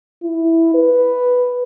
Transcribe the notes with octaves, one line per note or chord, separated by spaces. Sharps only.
E4
B4